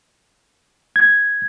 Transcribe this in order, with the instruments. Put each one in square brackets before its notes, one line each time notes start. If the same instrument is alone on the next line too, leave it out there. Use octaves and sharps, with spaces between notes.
[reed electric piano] G#6